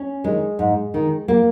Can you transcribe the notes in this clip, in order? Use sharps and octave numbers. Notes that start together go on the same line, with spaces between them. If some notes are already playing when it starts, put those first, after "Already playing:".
Already playing: C#4
D#3 G#3
G#2
D#3
A#3